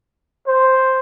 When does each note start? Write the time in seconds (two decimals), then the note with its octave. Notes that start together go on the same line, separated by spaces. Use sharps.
0.47 C5